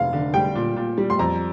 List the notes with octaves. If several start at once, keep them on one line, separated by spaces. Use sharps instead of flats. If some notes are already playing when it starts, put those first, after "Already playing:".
Already playing: F1 F5
D3
G3 G5
A#2
A#2
G3
C6
F2 A#5